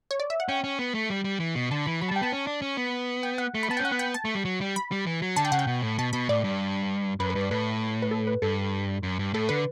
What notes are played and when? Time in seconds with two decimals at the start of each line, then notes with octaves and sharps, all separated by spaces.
0.11 C#5
0.20 D5
0.30 E5
0.40 F#5
0.49 C#4 G5
0.64 C#4
0.79 B3
0.94 A3
1.10 G3
1.24 G3
1.40 E3
1.55 B2
1.71 D3 A5
1.86 E3 B5
2.01 F#3 B5
2.09 A5
2.11 G3
2.16 G5
2.22 B3 A5
2.32 C#4
2.47 D4
2.62 C#4
2.77 B3
3.23 G5
3.38 F#5
3.55 A3
3.63 B5
3.70 B3 A5
3.77 G5
3.80 C#4
3.85 F#5
3.92 B3
3.99 G5
4.14 A5
4.25 A3
4.35 G3
4.45 F#3
4.61 G3
4.76 B5
4.92 G3
5.07 E3
5.22 F#3
5.36 D3 A5
5.45 G5
5.52 C#3 F#5
5.59 G5
5.67 B2
5.82 A2
5.98 B2 A5
6.13 B2 B5
6.29 A2 D5
6.44 G2
7.20 F#2 B4
7.30 B4
7.35 G2
7.41 D5
7.51 A2 B4
8.02 B4
8.11 A4
8.27 B4
8.42 G2 A4
9.03 F#2
9.19 G2
9.34 A2 A4
9.49 D3 B4